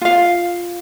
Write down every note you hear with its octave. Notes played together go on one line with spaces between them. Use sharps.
F4 F5